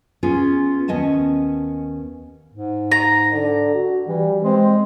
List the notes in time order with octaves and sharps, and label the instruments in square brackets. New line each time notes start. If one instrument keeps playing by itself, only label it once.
[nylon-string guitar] B3 C#4 F4 G#4
D#2 B3 C#4 D#5 G#5 A5
[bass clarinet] G#2
[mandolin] A#5
[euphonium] D3
F#4
[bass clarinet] E3 [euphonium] G3
[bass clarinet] G#3 [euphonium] C4